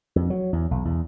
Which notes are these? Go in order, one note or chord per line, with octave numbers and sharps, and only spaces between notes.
F2
F#3
E2
B1
E2